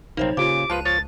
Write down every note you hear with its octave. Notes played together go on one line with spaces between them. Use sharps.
A#1 C3 F#3 A#3 C4 D#4 C5 C#5
A#2 C#3 C#4 F4 G4 C5 D6
C#2 F3 F4 B4 A5 F#6 D#7
F3 C#5 A6